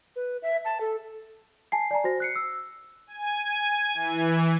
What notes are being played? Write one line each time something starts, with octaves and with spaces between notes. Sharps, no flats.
B4
E5
A5
A4
G#5 A5 C7
D5 G#5 A#5
F#4 C5 A#6
F#6 C7 C#7
E6
G#5
E3